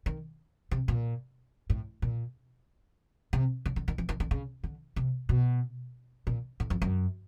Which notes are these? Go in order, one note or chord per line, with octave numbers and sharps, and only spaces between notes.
D#3
C3
A#2
A2
A#2
C3
C#3
D3
D#3
E3
D#3
D3
C#3
D3
C3
B2
A#2
A2
F2
F#2